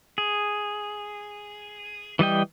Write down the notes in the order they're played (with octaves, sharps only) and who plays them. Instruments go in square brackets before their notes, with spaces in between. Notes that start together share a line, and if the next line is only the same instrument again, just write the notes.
[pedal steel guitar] G#4
E3 G3 D#5 G5